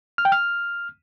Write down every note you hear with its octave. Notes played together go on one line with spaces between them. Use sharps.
F6
G5
F6